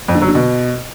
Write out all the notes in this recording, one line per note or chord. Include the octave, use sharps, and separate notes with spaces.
F2
D3
F#3
D3
B2